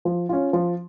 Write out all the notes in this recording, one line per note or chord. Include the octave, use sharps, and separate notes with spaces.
F3
C#4 F4
F3